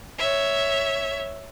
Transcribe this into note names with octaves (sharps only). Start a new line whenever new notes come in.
C#5 E5